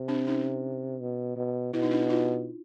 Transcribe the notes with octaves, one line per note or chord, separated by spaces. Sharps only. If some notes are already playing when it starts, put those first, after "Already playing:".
Already playing: C3
C4 D4
C#4 D#4
B2
B2
B2 E4
D#4
D4 E4
D#4 F4